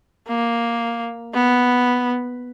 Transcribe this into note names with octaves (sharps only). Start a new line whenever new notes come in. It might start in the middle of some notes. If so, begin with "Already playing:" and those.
A#3
B3